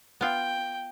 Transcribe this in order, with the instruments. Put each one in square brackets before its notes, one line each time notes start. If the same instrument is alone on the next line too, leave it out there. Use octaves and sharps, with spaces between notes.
[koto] B3 F4 [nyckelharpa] G5